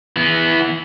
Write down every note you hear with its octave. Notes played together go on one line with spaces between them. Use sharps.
E3 B3